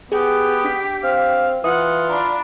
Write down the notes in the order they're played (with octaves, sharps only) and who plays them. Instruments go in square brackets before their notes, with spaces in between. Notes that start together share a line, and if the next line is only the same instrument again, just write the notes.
[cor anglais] B3 [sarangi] G4 [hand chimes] G#4
[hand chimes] D4 B6
[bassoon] C4 [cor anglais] F5
[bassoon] E3 [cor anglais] F4 [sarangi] F#5 [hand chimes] D#6
[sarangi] D4 [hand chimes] A#5 B5